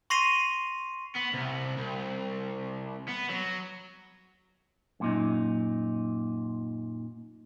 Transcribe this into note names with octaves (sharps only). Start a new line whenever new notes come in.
C6 C#6 A#6 C7 D#7 F7
B3
C2
C2
B3
F#3
F#2 A#2 D#4